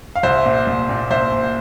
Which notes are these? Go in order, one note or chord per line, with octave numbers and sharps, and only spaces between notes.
F5
C2 C5 E5
A#2
C2
A#2
C2 C5 E5
A#2